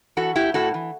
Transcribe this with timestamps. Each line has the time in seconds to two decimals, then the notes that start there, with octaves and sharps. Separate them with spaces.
0.17 E3 F#4 A4
0.35 A2 E4 G4
0.54 A2 F#4 A4
0.74 E3